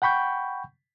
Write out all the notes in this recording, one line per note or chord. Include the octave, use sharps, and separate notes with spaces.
F#5 G5 B5 C#6 G6